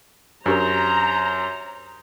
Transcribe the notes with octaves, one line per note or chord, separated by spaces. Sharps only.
F#2 D4 G4 A#4 C5 A#5